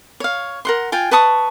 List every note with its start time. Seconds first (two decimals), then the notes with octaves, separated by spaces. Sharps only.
0.20 C#5 F5
0.65 A#4 F#5 C6
0.92 F4 G5 G#5
1.11 B4 A5 C#6 D#6